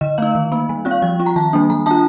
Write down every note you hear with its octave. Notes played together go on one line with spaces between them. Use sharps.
D3 D#5
A3 D#4 F5
D#3
A#3 D#4
G3
C4 F4
F5
F3 G5
C4 F4
A#5
D#3 A5
G3 A#3 D4
G3 A#5
D4 F4 A5